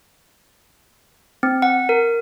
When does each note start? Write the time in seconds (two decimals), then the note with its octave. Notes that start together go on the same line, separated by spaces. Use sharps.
1.43 C4
1.62 F#5
1.89 A#4